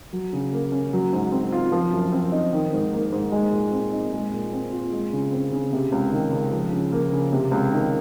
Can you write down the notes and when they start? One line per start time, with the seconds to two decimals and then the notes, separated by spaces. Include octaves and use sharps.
0.13 F#3
0.33 C#3
0.53 A#3
0.72 C#4
0.93 F#3
1.13 G#2
1.32 C4
1.52 F4
1.72 F3
1.93 F#2
2.12 C4
2.32 D#4
2.53 D#3
2.73 G#2
2.93 A#3
3.12 G#2
3.32 G#3
3.52 A#2
3.72 C4
3.93 D#4
4.13 G#3
4.33 A#2
4.52 C4
4.72 F4
4.93 G#3
5.13 C#3
5.32 C4
5.52 C#3
5.73 C3
5.92 C#2
6.11 D#3
6.32 C#2
6.52 F3
6.73 C#3
6.92 A#3
7.12 C#3
7.32 C3
7.51 C#2
7.72 D#3